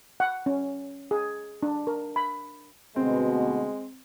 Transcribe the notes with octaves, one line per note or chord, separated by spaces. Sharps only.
F#5
C#4
G#4
D4
A#4
B5
D2 B2 G#3 C4